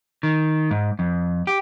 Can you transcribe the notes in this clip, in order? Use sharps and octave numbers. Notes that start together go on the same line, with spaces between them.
D#3
G#2
F2
G4